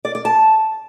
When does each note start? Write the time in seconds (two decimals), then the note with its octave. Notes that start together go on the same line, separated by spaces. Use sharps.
0.05 D5
0.15 D5
0.25 A5